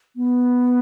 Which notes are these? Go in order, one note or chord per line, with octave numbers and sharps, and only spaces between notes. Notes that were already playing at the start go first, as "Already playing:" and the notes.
B3